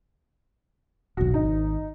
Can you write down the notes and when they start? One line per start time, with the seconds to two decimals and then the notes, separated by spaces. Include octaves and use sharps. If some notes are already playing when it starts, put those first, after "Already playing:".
1.17 D#1 B1 F#4
1.34 G#1 D#4